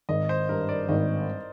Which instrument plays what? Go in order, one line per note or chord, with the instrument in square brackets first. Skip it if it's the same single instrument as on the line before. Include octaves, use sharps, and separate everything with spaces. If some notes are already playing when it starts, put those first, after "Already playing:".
[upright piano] G#1 [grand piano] D#5
[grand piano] C5
[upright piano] G2 [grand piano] A#4
[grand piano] D5
[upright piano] G#1 [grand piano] D#5